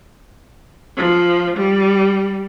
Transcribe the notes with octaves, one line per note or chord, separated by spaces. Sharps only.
F3
G3